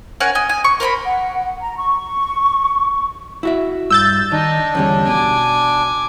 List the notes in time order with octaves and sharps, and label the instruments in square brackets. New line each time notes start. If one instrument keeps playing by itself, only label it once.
[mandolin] C#4 A#4 F#5 G#5
D#5 G#5
G#5
C#6
A#4 C5 A#5 B5
[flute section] F#5
A#5
C#6
[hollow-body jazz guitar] E4 F#4 E5
[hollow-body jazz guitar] G2 [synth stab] E6 G6 A6
[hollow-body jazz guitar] D#3 [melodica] D4 [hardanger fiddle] D#4
[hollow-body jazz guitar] E2 D3 G3 [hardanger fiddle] C#4
[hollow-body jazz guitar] B2 [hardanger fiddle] G#5 D6